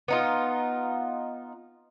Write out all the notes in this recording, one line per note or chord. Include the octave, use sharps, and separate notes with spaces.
B3 D#4 F4